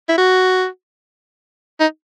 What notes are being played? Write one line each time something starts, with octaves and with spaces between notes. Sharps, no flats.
E4
F#4
D#4